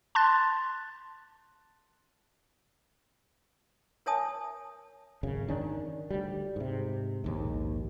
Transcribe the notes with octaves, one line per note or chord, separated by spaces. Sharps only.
A5 C6 F#6 A6
A#4 C#5 E5 G#5 A5 D#6
G#1 F#2 C#3
D#3 C#4 D4
D2 G3
G#2 C3
A#1 D#2 G#2